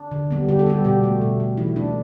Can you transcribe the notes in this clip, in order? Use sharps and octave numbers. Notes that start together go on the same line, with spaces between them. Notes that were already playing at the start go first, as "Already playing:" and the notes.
Already playing: D4
D3
G3 B3
D3 G4
A4
G3 B3 G4
B2 G4
A3
B2
A3
E3 E4
A3 D4